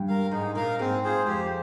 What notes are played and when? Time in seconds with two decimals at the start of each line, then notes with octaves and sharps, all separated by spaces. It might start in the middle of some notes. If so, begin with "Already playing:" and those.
Already playing: G2 G3
0.08 A#4 F5
0.31 G#2 G#3 D#4
0.55 A#2 A#3 A#4 F5
0.79 G#2 G#3 C4
1.03 F4 G#4 C5
1.27 F2 F3 G4